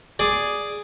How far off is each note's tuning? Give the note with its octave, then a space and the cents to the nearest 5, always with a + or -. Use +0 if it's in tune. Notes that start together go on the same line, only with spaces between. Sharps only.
G#4 +0 D5 +0